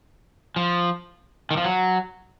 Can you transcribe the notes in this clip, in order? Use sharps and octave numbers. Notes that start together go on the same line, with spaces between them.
F3
D#3
F3
F#3